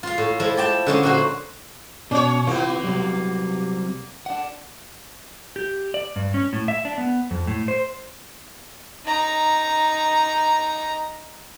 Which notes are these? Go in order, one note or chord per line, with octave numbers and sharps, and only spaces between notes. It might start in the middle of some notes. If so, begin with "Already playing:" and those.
F4 F5
A2
F3 G#3 E4
D5 G5 A5
D3 G#3 C#4
A#2 F#4 C5
B2 C#4 C#5
C3 E3 A#3 B3 F4
C3 F#3 G3
D4 F#5
G4
D5
G2
C#4
A2
E5
D4
B3
F2
A2
C5
D#4 A#5